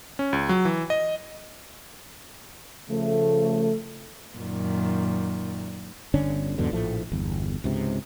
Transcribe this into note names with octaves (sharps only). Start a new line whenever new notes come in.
C#4
C#2
F#3
E3
D#5
C#3 F3 A3
F#2 A#2 D#3
G1 D3 C#4 D4
E2 G#2 B2 D3
A#1 A2 F3 A3
G1 E2
C#2 G#2 C3